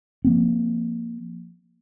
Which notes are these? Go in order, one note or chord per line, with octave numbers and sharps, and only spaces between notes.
F3 A#3 C4